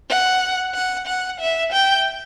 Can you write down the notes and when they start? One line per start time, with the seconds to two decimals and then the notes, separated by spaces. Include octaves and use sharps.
0.10 F#5
0.75 F#5
1.07 F#5
1.40 E5
1.73 G5